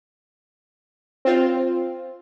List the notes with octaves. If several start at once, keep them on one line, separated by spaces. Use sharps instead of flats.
C4 F4